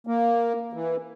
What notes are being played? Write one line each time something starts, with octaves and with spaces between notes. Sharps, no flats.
A#3
E3